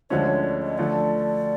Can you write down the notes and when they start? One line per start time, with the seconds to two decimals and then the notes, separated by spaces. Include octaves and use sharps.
0.10 D2 D3 F3 G#3 C#4 C5
0.28 C#5
0.44 D5
0.62 D#5
0.78 D3 F3 A3 D5